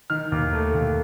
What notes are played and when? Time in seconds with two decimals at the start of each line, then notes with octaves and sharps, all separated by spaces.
0.10 D#3 F6
0.32 D#2
0.53 A3
0.75 D#2